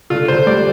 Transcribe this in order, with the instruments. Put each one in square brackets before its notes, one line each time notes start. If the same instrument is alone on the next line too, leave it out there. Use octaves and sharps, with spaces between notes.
[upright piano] D3 [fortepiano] F4
[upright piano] D3 [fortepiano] C5
[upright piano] G3 [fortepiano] D5